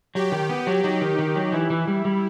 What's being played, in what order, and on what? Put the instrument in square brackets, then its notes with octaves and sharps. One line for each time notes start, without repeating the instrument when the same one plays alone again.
[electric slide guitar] F#3 [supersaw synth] G4
[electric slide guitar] D#3
B3
F#3
[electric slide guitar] F#3 [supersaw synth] D#4
[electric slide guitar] D#3
D#3
F#3
[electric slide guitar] E3 [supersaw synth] E4
[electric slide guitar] E3
G3
G3